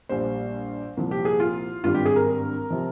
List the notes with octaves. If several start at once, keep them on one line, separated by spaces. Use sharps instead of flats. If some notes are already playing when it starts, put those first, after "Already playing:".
A#1 A#2 G3 C5
C2 A#2 F3
G4
G#4
F4
G#1 G2 G3 F4
G4
G#4
A#4
C3 F3